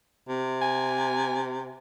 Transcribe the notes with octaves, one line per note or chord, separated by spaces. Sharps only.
C3
G#5